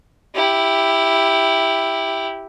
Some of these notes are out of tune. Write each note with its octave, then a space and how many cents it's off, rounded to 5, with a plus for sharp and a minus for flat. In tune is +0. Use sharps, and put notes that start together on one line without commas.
E4 +0 G4 +5